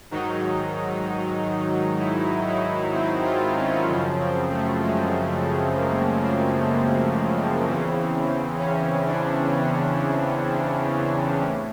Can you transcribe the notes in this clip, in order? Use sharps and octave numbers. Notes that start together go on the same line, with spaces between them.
G#2 D#3 F#3 D#4
E4
E4
C4
F4
C#4
F#2 C#3 F3
C4
A3
G#3
A3
A#3
C4
E2 C#3 E3
C#4
D4
C#4
A2